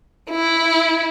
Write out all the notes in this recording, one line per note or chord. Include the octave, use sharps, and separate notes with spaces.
E4